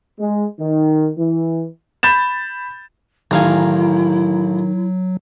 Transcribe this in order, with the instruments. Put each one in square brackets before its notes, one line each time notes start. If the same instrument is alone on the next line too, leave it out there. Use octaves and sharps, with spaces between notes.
[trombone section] G#3
D#3
E3
[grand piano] B5 G6 A6 E7
[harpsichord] A1 F5 G#5 [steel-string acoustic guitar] D#3 [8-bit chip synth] F#3 [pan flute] E4